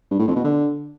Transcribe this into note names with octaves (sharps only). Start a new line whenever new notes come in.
G2
A2
F2
B2
D3